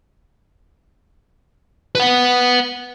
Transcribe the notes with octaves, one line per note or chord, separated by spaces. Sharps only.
B4 F#5